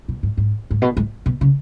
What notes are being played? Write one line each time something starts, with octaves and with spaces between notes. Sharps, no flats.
B2
G#2
G#2
G#2
B2
G#2
B2
C#3